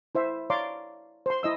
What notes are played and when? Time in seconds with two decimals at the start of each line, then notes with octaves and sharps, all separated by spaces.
0.15 E4 C5 E5
0.50 C#5 D5 F5 A#5 C6 D6
1.26 C5 C6
1.43 E4 D#5 E6